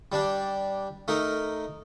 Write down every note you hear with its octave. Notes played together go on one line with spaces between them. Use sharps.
G3 D4
A3 D#4 A#4